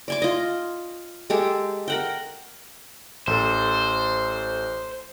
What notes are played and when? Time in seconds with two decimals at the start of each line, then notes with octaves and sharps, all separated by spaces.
0.08 D5 G#5 D6
0.22 F4 D#5
1.30 G#3 G4 A4
1.88 A#4 F#5 G5
3.27 A1 A4 C5